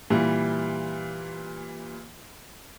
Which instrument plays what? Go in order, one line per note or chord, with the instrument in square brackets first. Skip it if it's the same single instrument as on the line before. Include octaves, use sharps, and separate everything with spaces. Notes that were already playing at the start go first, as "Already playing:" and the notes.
[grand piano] A#2 E3 G3